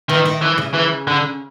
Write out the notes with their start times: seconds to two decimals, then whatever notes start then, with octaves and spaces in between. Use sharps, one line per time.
0.09 D#3 E3
0.25 D#3
0.42 E3
0.58 C#3
0.74 E3
1.07 D3